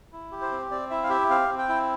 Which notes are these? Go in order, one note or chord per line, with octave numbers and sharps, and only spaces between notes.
E4
G4
C5
C4
C4 D5
E4 E5
F5
G4 E5
C4 F5
C4
G5
E4